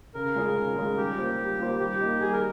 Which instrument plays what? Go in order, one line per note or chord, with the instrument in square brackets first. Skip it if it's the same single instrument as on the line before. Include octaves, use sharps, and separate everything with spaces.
[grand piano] C#3 [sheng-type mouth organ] A#4
[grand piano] G#3 C#4 F4 G#4
C#3
G#3 C#4 F4 G#4
[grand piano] G3 [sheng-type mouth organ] G4
[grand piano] A#3 F4 C5
G3
A#3 F4 C5
[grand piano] G3 [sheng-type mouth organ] G4
[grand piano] A#3 D#4
[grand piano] G3 [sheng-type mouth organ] G#4
[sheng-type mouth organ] A#4